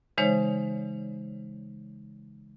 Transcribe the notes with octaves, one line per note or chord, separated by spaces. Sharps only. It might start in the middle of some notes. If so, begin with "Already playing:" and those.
C#3 E3 G#3 D#4 C5 C#5